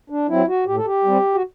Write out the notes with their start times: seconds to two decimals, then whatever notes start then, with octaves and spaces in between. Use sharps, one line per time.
0.10 D4
0.29 F#3 C4 E4
0.47 F#4
0.67 A2 G4
0.76 A4
0.85 G4
1.04 G3 C4
1.34 F#4